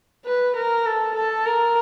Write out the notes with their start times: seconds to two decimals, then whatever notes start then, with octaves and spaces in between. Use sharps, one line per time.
0.25 B4
0.56 A#4
0.86 A4
1.15 A4
1.46 A#4